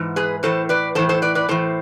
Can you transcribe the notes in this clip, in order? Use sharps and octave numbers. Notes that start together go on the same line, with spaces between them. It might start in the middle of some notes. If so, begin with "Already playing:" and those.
Already playing: G#2 E3
G#4 B4
A2 E3 A4 C5
B4 D5
A2 E3 A4 C5
A4 C5
B4 D5
B4 D5
A2 E3 A4 C5